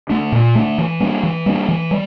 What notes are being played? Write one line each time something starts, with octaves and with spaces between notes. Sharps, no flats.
A3 D4
A#2
A3 D4
E3
G3 A#3 D4
E3
G3 A#3 D4
E3
G3